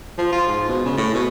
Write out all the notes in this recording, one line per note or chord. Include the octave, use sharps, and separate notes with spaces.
F3
F4
G#2
B2
C#3
A2
B2